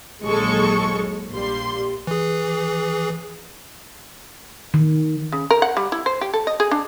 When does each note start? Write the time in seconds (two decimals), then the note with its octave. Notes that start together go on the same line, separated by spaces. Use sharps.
0.23 A#1 D#2 F#3 G#3 A4 C#6
1.31 A#1 G3 A#3 C6
2.07 E3 G#4
4.74 D#3
5.32 C#3
5.51 A#4
5.62 F#5
5.77 G3
5.92 E4
6.06 C5
6.21 G4
6.34 A4
6.47 D#5
6.60 G#4
6.71 D4